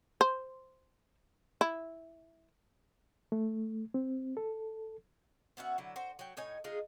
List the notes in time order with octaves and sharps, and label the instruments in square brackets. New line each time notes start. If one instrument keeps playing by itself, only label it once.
[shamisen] C5
E4
[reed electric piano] A3
C4
A4
[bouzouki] B3 C#4 F#4 E5
D3 F#3 E4
F#4 C5
F#3 G5
A2 D#4 C#5 G#5
G#3 D#4 F4 G#4